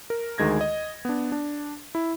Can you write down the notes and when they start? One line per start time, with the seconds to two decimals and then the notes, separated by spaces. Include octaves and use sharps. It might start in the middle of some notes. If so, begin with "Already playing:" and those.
0.10 A#4
0.38 D2 D#3 G#3 G#6 A#6
0.61 D#5
1.05 B3 D4
1.32 D4
1.95 E4